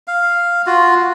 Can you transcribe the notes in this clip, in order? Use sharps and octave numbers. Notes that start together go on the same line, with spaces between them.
F5
F4 F#4